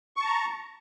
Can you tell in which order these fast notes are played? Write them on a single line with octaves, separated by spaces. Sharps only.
C#6 A5 A#5